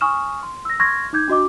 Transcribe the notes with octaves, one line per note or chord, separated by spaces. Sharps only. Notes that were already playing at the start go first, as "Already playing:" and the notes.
G#5 C#6 D#6 F6 E7
C6
E6 A#6
C6 C#6 F6 G#6 A#6
D#4 D6 G6 G#6
D4 F#4 D#5 D6